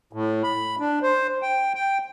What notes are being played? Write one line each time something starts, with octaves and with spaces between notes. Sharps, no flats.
A2
B5
D4
C5
G5
G5